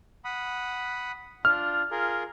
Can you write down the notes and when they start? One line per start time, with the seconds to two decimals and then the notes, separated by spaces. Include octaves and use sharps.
0.25 F#5 B5 D#6
1.45 D4 F4 F6
1.91 F4 G#4 A#4